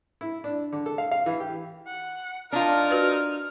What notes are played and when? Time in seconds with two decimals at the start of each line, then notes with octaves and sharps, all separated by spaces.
0.21 E4
0.44 D4
0.73 D3
0.86 A4
0.98 F5
1.11 F5
1.26 E3
1.40 G4
1.87 F#5
2.53 D4 D#4 F4 A#4 F6
2.91 F#4 B4